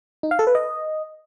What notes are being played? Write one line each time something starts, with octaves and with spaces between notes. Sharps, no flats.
D#4
F5
A4
B4
D#5